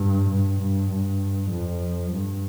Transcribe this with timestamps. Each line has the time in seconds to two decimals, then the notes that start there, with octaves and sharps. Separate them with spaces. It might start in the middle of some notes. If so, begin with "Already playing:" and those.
Already playing: G2
0.29 G2
0.60 G2
0.91 G2
1.50 F2
2.12 G2